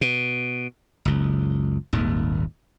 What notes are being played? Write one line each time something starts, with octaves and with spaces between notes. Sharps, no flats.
B2
F#1 C#2
D#1 G#1 D#2